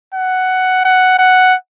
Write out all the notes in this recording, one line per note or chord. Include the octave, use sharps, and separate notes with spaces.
F#5
F#5
F#5